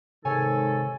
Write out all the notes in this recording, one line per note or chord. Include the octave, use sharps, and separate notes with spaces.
G#2 C3 D#3 A4 C#5 G#5